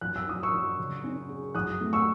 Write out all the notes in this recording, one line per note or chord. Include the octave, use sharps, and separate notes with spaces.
F#2 F#6
E6
F#3 D#6
C#6 E6
F#2
C#3
C#4
G#4
F#2 D#6 F#6
A3
C#6 E6